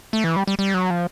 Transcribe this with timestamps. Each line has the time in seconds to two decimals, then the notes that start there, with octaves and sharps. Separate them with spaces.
0.13 A3
0.24 E3
0.36 G3
0.47 G3
0.59 G3
0.74 F#3
0.90 F3